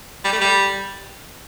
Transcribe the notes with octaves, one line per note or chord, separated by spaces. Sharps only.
G3
A3
G3